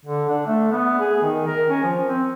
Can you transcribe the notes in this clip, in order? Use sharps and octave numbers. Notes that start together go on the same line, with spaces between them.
D3
D4
A3
B3
G#4
D#3
A#4
C#4
F3
C4